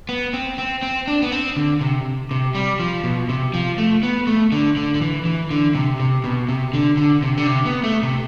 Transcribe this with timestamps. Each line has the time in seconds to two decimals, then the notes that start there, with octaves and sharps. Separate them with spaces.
0.09 B3
0.33 C4
0.58 C4
0.83 C4
1.08 D4
1.23 B3
1.32 C4
1.57 D3
1.81 C3
2.31 C3
2.55 G3
2.80 F3
3.04 B2
3.29 C3
3.54 F3
3.78 A3
4.03 B3
4.27 A3
4.52 D3
4.76 D3
4.95 D3
5.01 E3
5.25 E3
5.51 D3
5.75 C3
6.00 C3
6.24 B2
6.49 C3
6.74 D3
6.97 D3
7.23 C3
7.37 D3
7.47 C3
7.65 B3
7.84 A3
8.03 C3